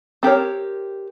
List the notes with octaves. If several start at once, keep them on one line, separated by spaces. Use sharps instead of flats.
C4 G4 A#4 C#5